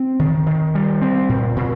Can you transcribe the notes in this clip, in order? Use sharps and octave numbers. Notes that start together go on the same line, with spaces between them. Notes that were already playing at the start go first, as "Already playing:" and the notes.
Already playing: C4
D#3
D#3
G3
C4
A#2
A#2